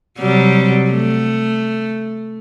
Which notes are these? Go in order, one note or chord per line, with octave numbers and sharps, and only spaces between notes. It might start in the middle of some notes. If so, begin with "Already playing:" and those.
C3 F#3 G3
A3